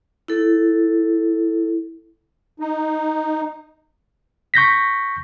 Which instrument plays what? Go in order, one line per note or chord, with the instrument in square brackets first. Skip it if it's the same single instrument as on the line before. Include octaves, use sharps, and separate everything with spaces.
[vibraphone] E4 A4
[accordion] D#4
[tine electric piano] C#6 G6 A#6 B6